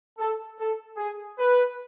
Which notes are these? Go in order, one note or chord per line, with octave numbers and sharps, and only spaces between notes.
A4
A4
G#4
B4